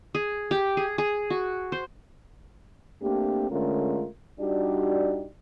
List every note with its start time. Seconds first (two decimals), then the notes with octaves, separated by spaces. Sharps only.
0.15 G#4
0.51 G4
0.77 G#4
0.98 G#4
1.30 F#4
1.72 C5
3.02 A3 A#3 C4 D4 G4
3.50 D3 G#3 A3 C#4 F4 A#4
4.40 G3 D4 D#4 F#4 G4 D5